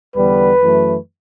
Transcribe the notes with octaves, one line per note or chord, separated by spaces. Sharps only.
E2 D3 G3 B3 B4
F#2 E3 A3